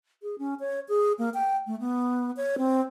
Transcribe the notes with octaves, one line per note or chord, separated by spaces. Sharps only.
G#4
C#4
C#5
G#4
A#3
G5
A3
B3
C#5
C4